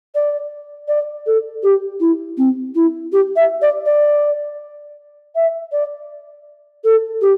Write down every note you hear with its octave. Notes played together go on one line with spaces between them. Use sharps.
D5
D5
A4
G4
E4
C4
E4
G4
E5
D5
D5
E5
D5
A4
G4